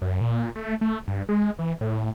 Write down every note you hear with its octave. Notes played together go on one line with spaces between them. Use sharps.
F#2
A#2
A3
A3
G2
G#3
E3
A2